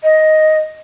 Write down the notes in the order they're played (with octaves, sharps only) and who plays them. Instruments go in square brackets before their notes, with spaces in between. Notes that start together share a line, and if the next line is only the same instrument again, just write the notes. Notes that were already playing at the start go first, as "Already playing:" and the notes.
[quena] D#5